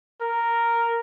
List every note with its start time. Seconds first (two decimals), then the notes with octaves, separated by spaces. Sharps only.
0.21 A#4